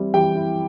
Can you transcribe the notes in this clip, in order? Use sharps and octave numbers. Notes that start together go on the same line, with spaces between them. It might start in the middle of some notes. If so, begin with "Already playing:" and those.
Already playing: E3 G3 C4 E4
E3 G4 G5
E4